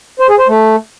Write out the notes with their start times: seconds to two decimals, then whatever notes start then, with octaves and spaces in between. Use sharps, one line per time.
0.19 C5
0.29 G#4
0.39 C5
0.48 A3